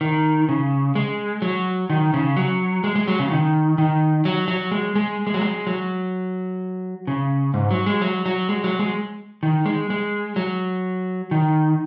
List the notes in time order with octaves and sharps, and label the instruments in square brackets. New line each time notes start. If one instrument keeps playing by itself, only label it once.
[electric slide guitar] D#3
C#3
G#3
F#3
D#3
C#3
F#3
G#3
G#3
F#3
C#3
D#3
D#3
F#3
F#3
G#3
G#3
G#3
F#3
G#3
F#3
C#3
G#2
F#3
G#3
F#3
F#3
G#3
F#3
G#3
D#3
G#3
G#3
F#3
D#3